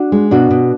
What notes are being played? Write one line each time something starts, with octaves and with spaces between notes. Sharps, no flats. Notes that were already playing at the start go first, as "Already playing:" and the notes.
Already playing: D4 F#4
G#3
B2 D4 F#4
B2